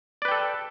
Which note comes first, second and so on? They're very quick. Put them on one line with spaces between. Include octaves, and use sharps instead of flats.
D5 B4 G5 A4